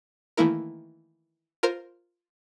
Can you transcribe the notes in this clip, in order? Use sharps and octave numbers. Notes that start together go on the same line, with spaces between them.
D#3 E3 A3 A#3 E4 A#4
F4 A#4 C5